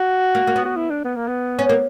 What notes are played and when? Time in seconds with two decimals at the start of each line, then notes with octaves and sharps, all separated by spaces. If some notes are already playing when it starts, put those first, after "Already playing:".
Already playing: F#4
0.35 A#3
0.47 A#3
0.56 B3
0.65 F#4
0.76 E4
0.90 D4
1.04 B3
1.16 A#3
1.28 B3
1.59 C#4
1.69 A#3